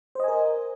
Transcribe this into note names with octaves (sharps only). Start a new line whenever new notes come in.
A#4 C5 D#5 G#5